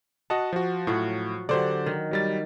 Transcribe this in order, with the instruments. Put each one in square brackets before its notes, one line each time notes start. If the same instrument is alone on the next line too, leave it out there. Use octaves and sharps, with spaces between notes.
[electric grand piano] F#4 D#5 A5 [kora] F#5
[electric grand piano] F3 F#4
[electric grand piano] A2 [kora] F3 F#3 F#4
[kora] D3 F#3 [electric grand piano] G4 C5 D5
[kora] D#3
[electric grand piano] F#3 G3 A6